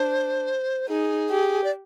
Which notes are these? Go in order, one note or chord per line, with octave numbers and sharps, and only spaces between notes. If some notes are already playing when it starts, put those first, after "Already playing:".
Already playing: D4 C5
D#4 G#4
G4
D5